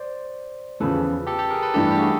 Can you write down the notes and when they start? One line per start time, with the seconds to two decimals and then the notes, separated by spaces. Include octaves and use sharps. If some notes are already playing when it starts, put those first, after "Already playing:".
Already playing: C5 D5
0.80 E2 C#3 F3 A4 B4
1.27 G4 A4
1.39 G4 A4
1.50 G#4 A#4
1.62 A4 B4
1.74 G2 E3 A3 D4 G4 A4
1.91 G4
1.97 F#4 G#4